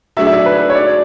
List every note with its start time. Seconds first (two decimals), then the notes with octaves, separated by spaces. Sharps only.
0.17 F#3 A3 D4 G#4 E5
0.27 E5
0.32 D5
0.46 B4
0.70 C#5
0.75 D5